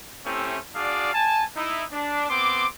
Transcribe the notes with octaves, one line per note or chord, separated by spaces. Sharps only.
A3 C4 C#4 E4 G4
D4 F#4 G#4 D5 F5
G#5 A5
D#4 E4
D4
B3 C4 C6 D6